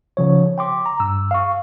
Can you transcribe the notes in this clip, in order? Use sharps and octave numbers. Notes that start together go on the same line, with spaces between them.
C#3 F3 C#5
G5 C6 D6
A#5
G2 E6
F5 C#6